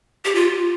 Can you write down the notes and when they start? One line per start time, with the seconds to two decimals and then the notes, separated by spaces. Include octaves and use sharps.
0.25 G4
0.35 F4